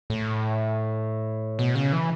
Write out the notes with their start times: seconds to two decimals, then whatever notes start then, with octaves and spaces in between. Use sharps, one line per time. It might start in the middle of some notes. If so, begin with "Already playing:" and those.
0.10 A2
1.59 B2
1.75 C#3
1.92 E3